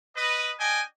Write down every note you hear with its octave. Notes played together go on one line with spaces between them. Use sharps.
B4 D#5
D4 D#5 G5 G#5